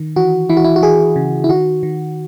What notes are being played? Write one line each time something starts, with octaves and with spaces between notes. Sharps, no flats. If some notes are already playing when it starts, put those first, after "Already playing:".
Already playing: D#3
E3 F#4
E3 E4
F#4
E4
F#4
E3 G#4
C#3
E4
D#3 F#4
D#3